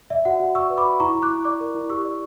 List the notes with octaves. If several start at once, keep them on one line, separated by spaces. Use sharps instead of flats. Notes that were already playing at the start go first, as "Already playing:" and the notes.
D5 E5
F#4 F#5
F#4
D5 C#6 E6
B4
B5 D6
F#4
E4 A#5 C#6
E4
D6 F#6
E4
D5 D6 F#6
A#4
E4
G4 C#6 E6
D5